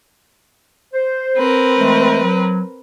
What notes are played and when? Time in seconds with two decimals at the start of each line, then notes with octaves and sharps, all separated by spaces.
0.94 C5
1.36 C4 A#4 B4
1.78 E3 G#3 A3
2.23 F#3